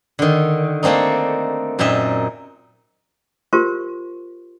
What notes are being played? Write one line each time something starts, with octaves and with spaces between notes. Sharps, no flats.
D3 D#3
A3 A#3 C4 D4 D#4
F#2 A#2 C4 D#4 E5
F4 G4 A#4 C5 C6 C#6